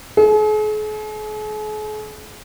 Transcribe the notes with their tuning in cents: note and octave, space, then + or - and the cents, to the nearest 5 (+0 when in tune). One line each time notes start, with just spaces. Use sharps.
G#4 +45